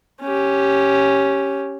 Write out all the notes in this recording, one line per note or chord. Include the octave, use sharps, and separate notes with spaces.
C#4 G4